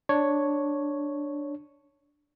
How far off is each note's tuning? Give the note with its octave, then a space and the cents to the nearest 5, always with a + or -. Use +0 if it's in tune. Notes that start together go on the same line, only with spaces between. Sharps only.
D4 +0 C#5 +0